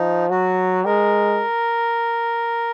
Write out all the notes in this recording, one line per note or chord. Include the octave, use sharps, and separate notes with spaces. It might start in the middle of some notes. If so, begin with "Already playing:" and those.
Already playing: F3 D#4
F#3 F#4
G#3 A#4